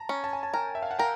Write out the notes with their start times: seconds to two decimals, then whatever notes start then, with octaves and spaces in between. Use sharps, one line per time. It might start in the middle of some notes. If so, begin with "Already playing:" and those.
Already playing: A5 A#5
0.09 C#4
0.24 A5
0.33 G#5
0.43 A5
0.54 A#4 G5
0.75 E5
0.83 F5
0.91 F#5
0.99 A#4 G5